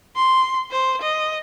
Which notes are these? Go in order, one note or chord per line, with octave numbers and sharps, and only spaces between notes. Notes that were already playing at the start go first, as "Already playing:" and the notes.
C6
C5
D#5